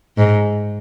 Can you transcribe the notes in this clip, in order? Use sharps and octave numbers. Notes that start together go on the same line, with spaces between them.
G#2